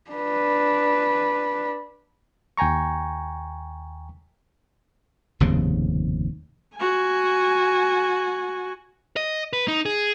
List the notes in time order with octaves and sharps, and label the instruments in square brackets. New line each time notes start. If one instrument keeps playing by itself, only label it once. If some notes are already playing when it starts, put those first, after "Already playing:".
[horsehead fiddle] D4 B4
[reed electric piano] D#2 G5 G#5 A#5 C#6
[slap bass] F1 D#2 G#2 C#3
[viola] F#4 G#5
[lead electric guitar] D#5
B4
D#4
G#4